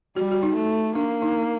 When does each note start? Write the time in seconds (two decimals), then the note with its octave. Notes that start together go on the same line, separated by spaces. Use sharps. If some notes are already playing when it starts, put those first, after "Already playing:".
0.16 G3 F#4
0.32 F#4
0.43 D#4
0.56 A3
0.95 A#3 D4
1.22 D#4